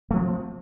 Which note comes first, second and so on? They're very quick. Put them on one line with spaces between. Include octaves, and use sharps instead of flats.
A3 F3 C4